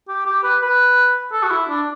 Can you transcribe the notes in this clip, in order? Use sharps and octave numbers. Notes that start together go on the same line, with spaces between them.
G4
G4
B4
B4
A4
F#4
E4
D4